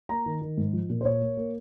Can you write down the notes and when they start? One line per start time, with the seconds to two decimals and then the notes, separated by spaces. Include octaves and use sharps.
0.09 A#3 A#5
0.26 D#3
0.42 D#3
0.57 G#2
0.73 F3
0.89 A#2
1.01 C5
1.05 A#2 C#5
1.21 A#3
1.37 A#3